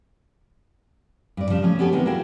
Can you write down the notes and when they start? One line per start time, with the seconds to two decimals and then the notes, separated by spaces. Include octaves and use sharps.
1.37 G2 D5
1.50 C#3 F3 G3
1.62 F3 A3 C#4
1.79 B3 C#4 G4 A4 G#5
1.92 C3 D#3 B3 D#4
2.05 A#3 E4 F#4 G#4 G5